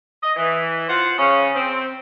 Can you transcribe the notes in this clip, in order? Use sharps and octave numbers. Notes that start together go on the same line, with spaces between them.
D#5
E3
F4 C5 F#5
C#3 C#4
C4